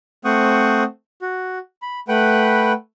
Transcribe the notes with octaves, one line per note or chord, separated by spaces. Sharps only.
A3 C4 C5 F#5 C#6 D#6
F#4
B5
A3 B4 F#5 G5 B5